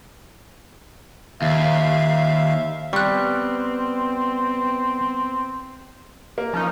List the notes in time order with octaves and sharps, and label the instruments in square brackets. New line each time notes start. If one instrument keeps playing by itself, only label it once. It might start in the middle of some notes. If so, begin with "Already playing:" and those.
[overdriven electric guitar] D#2 [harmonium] E5 F5
[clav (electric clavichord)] G3 [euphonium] B3 [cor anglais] C4 [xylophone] C#6 F#6
[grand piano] A#3
[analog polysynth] F3 C#4 D#4